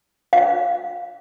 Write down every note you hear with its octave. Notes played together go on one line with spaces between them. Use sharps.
F5